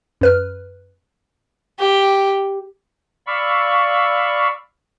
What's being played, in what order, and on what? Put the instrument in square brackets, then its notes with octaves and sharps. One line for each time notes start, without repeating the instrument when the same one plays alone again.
[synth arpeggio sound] F#2 B4 F6
[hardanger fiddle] G4
[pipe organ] D5 F5 B5 C#6 E6